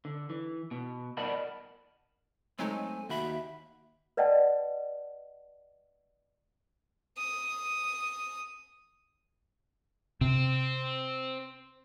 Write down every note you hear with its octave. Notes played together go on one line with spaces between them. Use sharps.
D3
E3
B2
A#4 D5 D#5 F#5 A5 B5
F#3 G#3 A3 C4 D#4 G#5
D#2 F#4 E5 B5
B4 D5 D#5 F#5 G5 A5
D#6
C3 C4